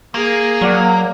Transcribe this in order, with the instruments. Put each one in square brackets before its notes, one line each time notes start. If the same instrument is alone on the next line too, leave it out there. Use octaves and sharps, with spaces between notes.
[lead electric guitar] A#3 [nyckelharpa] G#4
[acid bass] F#3 [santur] D5 F5 F#5